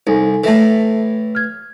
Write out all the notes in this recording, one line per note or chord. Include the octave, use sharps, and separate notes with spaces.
C2 D#4 A4 G#5
A2 E3 A4 E5 A5
F6 G#6